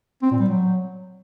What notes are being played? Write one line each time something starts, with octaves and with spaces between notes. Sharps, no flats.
C4
A#2
G3
F#3